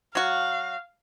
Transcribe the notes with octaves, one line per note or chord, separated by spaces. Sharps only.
F#3 F#4 F5